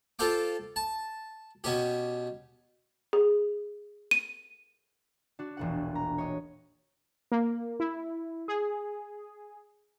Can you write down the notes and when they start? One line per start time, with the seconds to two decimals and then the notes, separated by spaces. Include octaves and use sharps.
0.19 F4 A4 C5 F5 G5 D6
0.76 A5
1.64 B2 C#4 G4
3.13 G#4
4.11 D#7
5.39 D4 F#4
5.57 E1 A#1 F#5
5.95 A#5
6.18 C#5 D#5
7.32 A#3
7.80 E4
8.48 G#4